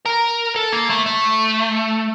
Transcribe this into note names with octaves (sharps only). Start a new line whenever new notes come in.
A#4
A4
A#3
A3
A3